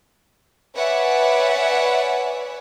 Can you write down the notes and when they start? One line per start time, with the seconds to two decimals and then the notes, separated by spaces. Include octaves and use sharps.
0.76 B4 C#5 D5 E5 F#5 G#5